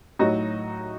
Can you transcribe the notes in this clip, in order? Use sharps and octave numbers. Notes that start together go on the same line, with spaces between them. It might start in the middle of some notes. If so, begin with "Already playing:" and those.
A2 F#3 D#4 F#4